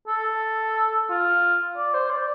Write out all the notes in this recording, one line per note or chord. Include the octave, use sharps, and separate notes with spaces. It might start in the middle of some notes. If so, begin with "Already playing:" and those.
A4
F4
D5
C5
D5